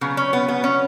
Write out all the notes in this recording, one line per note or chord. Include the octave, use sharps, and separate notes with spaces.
C#3 F#3 B3
C#4
B3
B3
C#4